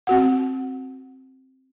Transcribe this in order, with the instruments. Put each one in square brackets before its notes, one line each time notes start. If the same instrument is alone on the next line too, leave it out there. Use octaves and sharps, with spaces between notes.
[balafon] C4 F#4 F#5